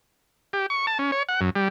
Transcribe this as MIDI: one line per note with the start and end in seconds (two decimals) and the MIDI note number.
0.53 0.66 67
0.70 0.86 85
0.87 0.98 81
0.99 1.11 61
1.12 1.23 73
1.29 1.40 78
1.41 1.50 42
1.56 1.68 55